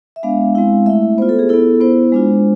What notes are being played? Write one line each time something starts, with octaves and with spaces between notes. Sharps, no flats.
E5
G#3 B3 D4 F5
G#3 C4 E4 F5
A3 E4 E5
B3 F4 C5
A4
G#4
B3 E4 A4
B3 E4 C5
G#3 D4 F4